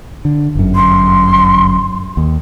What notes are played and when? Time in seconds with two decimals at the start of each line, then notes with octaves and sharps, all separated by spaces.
0.25 D3
0.55 G1 F#2
0.75 C6
2.17 D#2